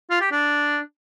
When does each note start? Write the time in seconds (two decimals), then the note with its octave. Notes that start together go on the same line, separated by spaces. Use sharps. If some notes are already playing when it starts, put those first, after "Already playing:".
0.10 F4
0.21 G4
0.31 D4